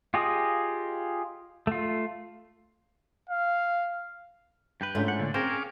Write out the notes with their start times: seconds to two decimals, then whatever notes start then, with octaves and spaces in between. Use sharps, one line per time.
0.14 F4 G4 G#4 D#5
1.67 A3 F4
3.29 F5
4.81 G2 B4 G5
4.95 G#2 A3 C#4 D4 F4
5.08 F#5
5.19 A#2 D3
5.34 C4 C#4 G#4 A#4 C5 F5 D6